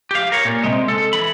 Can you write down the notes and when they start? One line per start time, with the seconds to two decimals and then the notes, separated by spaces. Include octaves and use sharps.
0.11 G4 F5
0.32 A#4 C#5
0.45 A#2
0.63 C3 G#3
0.88 A4
1.13 E3 B5